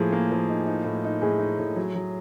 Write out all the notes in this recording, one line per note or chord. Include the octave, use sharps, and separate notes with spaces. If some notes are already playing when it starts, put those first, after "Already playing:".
Already playing: A2 F3 A#3 G#4
A#3
F3
D#4
D#4
A2
D#4
A2 G#4
D#4
A2
F#3
F#3